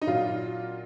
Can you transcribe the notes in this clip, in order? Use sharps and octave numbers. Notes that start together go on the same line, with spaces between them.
D#4
A#2 F#3 F4